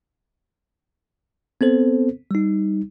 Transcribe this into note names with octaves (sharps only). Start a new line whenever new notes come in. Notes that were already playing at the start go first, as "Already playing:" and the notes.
B3 C4 A4 C5
G3 D#4